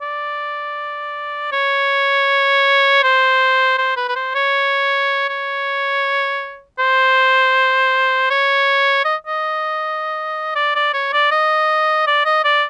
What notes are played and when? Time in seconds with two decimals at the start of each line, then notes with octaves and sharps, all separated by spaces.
0.02 D5
1.52 C#5
3.03 C5
3.78 C5
3.97 B4
4.09 B4
4.16 C5
4.35 C#5
5.29 C#5
6.79 C5
8.31 C#5
9.05 D#5
9.27 D#5
10.56 D5
10.75 D5
10.94 C#5
11.13 D5
11.31 D#5
12.07 D5
12.25 D#5
12.45 D5